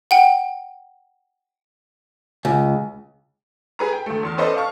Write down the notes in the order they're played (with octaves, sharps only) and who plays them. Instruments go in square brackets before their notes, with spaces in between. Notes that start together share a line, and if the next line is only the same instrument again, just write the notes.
[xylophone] F#5 G5
[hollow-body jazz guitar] C#2
[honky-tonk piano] G#4 B4 A#5
G5
D2 A3
E2 C6 F6
C#4 A4 B4 C5 D5 D#5
F5 A5 C#6 F6